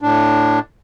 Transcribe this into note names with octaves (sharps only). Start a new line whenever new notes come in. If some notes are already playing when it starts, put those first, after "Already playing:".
A2 D4